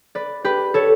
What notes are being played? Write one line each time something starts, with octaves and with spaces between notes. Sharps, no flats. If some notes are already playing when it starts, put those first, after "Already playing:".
B4 D5
G4 B4
A4 C#5